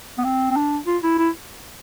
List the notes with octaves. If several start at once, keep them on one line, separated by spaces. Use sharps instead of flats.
B3
C4
C4
D4
F4
E4
E4